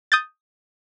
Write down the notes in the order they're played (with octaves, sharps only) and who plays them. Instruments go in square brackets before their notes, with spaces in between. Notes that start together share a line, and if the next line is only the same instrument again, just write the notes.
[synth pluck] D#6 G6 A6